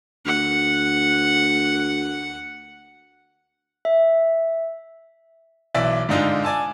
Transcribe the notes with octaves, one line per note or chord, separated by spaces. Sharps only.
D2 F#5
E5
B1 E3 D5 E5 D6 E6
G#2 D3 D4 D#4 F4
D5 G#5 A5 E6